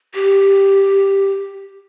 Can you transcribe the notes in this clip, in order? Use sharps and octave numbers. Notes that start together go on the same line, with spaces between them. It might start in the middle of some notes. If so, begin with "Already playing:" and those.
G4